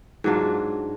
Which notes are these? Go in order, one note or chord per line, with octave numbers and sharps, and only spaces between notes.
G#2 F#3 D4 F4